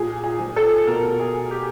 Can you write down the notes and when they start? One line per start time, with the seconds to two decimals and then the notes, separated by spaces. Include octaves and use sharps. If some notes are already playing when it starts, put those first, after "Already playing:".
Already playing: A#2 G#4
0.24 G#4
0.39 F3
0.56 A4
0.87 B2 A#4
1.20 G#4
1.51 G4